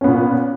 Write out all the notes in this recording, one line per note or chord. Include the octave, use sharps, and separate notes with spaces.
A#2 B3 C#4